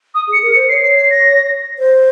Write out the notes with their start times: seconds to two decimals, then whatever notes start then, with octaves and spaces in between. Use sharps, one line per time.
0.14 D#6
0.28 G#4
0.33 C#7
0.42 A#4
0.51 C#7
0.55 C5
0.69 C#5 C7
0.83 C7
0.96 C7
1.10 A#6
1.79 C5